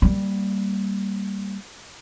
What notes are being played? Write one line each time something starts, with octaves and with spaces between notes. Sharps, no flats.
G3 A#3